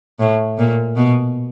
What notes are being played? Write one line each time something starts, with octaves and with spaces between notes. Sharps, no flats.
A2
A#2
B2